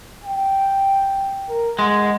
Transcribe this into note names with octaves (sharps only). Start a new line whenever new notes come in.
G5
A#4
G#3 F#5